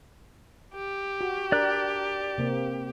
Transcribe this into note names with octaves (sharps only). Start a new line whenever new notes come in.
G4
F#4
D4 A#4 D5 F#6
C3 A#3 C4